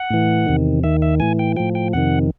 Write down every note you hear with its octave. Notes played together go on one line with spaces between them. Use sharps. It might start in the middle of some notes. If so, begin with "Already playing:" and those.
Already playing: F#5
A2 E3
E2 C3 D#3
D#2 D#3 E5
E5
A2 E3 G#5
G5
A2 F3 G5
G5
F2 C3 D#3 F#5